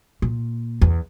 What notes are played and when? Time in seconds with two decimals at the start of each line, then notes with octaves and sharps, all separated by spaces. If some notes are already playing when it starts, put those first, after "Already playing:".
0.22 A#2
0.81 E2